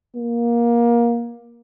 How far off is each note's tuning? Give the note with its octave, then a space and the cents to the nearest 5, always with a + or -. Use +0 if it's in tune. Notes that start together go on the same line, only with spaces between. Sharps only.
A#3 +20